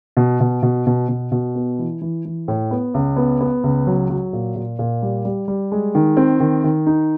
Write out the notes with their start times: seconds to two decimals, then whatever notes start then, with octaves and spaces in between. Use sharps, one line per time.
0.17 B2
0.40 B2
0.63 B2
0.87 B2
1.08 B2
1.32 B2
1.55 B3
1.79 E3
2.01 E3
2.25 E3
2.48 A2
2.71 B3
2.94 C#2
3.17 B3
3.41 B3
3.64 C#2
3.87 F#3
4.10 F#3
4.33 A#2
4.56 A#2
4.79 A#2
5.02 G3
5.25 G3
5.48 G3
5.72 G#3
5.95 D#3
6.17 C4
6.40 D#3
6.64 D#3
6.87 D#4